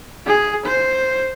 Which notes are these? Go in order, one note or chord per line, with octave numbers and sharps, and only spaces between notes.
G#4
C5